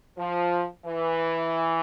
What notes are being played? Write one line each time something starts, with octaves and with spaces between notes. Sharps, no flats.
F3
E3